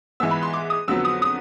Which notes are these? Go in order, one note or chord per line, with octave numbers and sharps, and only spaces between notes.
G#2 E3 G#3 B3 E6
B5
C6
D6
D#6
F2 D3 F#3 B3 E6
D#6
D#6